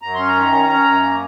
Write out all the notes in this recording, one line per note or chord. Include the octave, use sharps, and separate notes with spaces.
F#2 A#5
C#4 C6
A#5
D#3
C#4
C#4
F#2
A#3